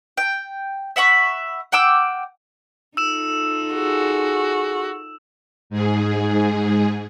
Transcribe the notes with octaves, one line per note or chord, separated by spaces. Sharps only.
G5
E5 F#5 B5 C#6
F#5 G5 D6 E6
D#4 F4 A4 E6 E7
F#4 G#4
G#2 G#4